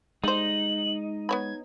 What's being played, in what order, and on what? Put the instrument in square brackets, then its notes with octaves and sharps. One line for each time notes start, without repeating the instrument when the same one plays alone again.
[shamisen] G3 C5 [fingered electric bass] G#3 [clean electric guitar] D#4 [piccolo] F#7
[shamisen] B3 C#5 B5 [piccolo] G#6